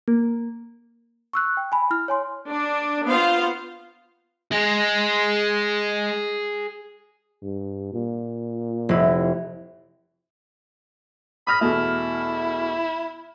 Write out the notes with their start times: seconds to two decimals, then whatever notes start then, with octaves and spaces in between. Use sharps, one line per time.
0.08 A#3
1.33 C#6 E6 F#6
1.57 G5
1.72 G#5 B5
1.91 E4 F6
2.08 C#5 G#5 C6
2.49 D4
3.08 B3 F4 C5 F5
4.52 G#3 G#4 D#5
7.42 G2
7.93 A#2
8.89 F1 E4
11.47 B5 D#6 F6 A#6
11.61 E2 B2 A3 E4